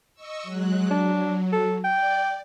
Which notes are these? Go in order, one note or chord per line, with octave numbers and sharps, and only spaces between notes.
D#5 C#6 E6
F#3 G#3 F#6
F#3 D4
A4
D5 G5